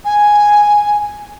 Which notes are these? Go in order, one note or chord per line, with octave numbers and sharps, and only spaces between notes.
G#5